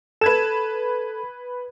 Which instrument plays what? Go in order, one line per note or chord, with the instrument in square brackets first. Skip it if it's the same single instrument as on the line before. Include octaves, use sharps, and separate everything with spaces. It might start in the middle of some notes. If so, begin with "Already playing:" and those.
[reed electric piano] A4 [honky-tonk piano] B4 G#6 E7